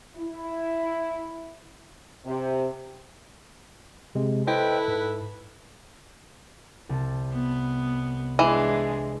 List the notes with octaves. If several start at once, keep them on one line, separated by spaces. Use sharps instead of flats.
E4
C3
C3 G#3
E4 A4 B4 C5 D#5 G5
G#2
C2 A5
B3
E3 G#3 D4